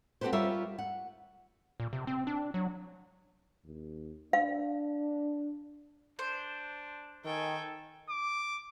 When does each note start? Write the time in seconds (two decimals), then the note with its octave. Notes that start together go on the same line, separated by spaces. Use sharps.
0.21 C4 F#4 G4 A4 B4 C5
0.32 G3 F4 A#4 C#5 E5
0.78 F#5
1.80 A#2
1.93 C3
2.07 C4
2.27 D4
2.54 F#3
3.65 D#2
4.33 D4 F5
6.19 D4 C5
7.25 D#3 A4 G5 G#5
8.09 D6